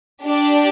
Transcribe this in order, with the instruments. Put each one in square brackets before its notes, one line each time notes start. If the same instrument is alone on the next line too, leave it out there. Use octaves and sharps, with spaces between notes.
[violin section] D4 G4 D5